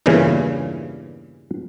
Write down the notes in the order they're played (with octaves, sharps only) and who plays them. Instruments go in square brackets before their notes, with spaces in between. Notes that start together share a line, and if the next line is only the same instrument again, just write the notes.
[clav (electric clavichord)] E2 G2 A#2 C#3 E3